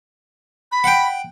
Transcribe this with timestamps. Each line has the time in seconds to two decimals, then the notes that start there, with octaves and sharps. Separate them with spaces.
0.72 B5
0.84 F#5 G5